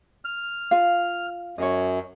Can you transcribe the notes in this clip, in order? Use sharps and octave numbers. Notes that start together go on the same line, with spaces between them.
F6
F4 F5
F#2 C#5 D#5